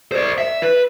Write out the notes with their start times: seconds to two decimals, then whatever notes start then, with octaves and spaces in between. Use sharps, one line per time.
0.12 C5 D5
0.38 E5
0.62 B4